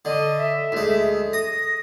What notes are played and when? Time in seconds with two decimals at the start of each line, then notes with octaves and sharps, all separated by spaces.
0.05 D3 D#5
0.38 E5
0.72 D2 G#3
1.33 D#6 A#6